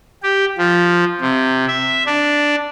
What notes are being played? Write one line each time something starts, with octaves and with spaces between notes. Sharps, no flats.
G4
F3
C3
E5
D4